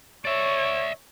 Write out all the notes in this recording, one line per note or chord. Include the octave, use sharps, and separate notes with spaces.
C#5 D5 E5